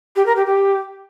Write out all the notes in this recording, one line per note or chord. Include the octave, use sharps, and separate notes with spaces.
G4
A#4
G4
G4